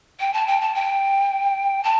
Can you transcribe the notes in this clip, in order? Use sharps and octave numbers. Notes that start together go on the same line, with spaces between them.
G5
A5
G5
A5
G5
A5